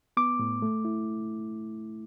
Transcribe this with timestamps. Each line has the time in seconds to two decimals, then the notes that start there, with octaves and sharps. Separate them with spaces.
0.17 B3 D6
0.39 A2
0.62 A3
0.85 E4